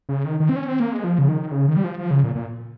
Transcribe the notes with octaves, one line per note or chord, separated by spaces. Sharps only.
C#3
D#3
D#3
C4
C#4
C4
A#3
G#3
F3
C#3
D#3
C#3
D#3
G3
F3
F3
C#3
A#2
A#2